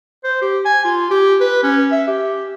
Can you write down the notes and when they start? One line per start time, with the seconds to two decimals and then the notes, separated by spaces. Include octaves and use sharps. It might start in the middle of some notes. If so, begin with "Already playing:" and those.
0.24 C5
0.42 G4
0.65 G#5
0.85 F4
1.11 G4
1.40 B4
1.63 C#4
1.92 E5
2.07 G4